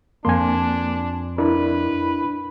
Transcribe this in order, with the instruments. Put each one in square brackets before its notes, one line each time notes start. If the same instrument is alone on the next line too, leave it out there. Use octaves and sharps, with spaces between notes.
[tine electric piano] F2 C6 [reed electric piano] A#3 G#5 [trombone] D4
[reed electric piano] D4 E4 A#4 [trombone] B4